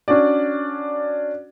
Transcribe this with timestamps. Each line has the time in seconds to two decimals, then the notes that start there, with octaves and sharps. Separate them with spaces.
0.08 C#4 D4 F#4 D5